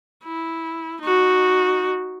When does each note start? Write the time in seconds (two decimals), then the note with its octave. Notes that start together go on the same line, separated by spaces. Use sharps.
0.24 E4
1.01 D#4 F#4